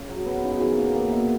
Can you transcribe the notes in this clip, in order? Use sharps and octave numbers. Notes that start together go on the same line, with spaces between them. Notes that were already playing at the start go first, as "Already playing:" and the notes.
Already playing: C#3
F#3
B3
C#3 D#4
F#4
E3 G#4
A#4
A#3 C#5
A#3
B2 E5